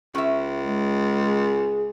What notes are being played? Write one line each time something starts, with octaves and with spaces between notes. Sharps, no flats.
C#2 C#4 E5
G#3
G#4